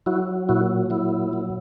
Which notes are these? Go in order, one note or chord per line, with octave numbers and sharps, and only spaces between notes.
F#3 E4 F#4
A#2 E4 F#4
F#3 E4
F#3